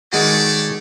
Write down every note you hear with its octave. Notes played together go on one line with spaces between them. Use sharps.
D#3 G#3 A3 F#4 C#5 D5